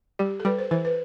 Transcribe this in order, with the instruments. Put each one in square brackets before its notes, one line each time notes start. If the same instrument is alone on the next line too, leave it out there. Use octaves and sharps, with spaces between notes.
[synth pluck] G3 [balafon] G4
[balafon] A4
[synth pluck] G3 [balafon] B4
[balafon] C5
[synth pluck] E3 [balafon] C5
[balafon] B4